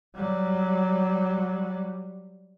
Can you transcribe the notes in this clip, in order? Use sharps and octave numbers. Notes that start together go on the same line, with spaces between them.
F#3 G3